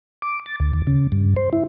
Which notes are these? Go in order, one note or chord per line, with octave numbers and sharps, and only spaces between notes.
D6
A6
D2
D#2
C#3
G2
C5
E4